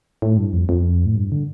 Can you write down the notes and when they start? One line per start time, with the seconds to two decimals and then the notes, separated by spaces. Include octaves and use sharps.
0.22 A2
0.37 G2
0.53 F2
0.69 F2
1.06 A2
1.16 G2
1.32 D3